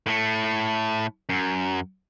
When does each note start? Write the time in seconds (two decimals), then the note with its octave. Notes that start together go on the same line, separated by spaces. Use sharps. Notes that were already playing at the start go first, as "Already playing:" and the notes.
0.06 A2 A3
1.29 F#2